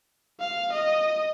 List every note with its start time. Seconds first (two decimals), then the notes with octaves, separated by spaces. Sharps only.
0.40 F5
0.73 D#5